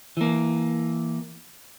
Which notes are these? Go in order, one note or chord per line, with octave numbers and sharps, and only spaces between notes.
E3 A#3